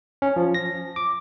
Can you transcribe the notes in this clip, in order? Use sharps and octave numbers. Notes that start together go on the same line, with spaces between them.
C#4
F3
A#6
D6